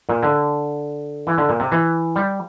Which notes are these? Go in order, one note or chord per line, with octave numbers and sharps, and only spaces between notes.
A#2
D3
E3
D3
A#2
C3
E3
G3